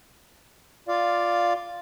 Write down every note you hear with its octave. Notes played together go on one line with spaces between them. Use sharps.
F4 D5 F5